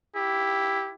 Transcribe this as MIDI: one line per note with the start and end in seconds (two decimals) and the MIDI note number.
0.15 0.91 64
0.15 0.95 67